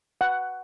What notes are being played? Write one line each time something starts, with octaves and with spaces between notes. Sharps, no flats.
F#5